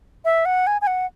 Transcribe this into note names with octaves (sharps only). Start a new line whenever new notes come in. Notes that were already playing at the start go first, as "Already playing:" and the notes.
E5
F#5
G#5
G#5
F#5